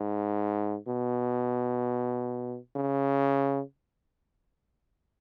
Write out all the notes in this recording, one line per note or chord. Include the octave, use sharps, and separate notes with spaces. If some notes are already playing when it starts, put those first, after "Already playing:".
Already playing: G#2
B2
C#3